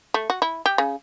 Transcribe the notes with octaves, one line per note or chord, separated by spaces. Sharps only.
A3
F#4
E4
G4
C#3